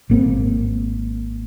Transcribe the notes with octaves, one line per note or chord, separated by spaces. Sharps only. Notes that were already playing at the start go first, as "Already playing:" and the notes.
G#1 A#3 C4